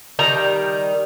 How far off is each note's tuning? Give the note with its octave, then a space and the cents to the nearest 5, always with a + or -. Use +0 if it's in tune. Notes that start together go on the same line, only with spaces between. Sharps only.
D#3 +0 G3 +0 A#5 +0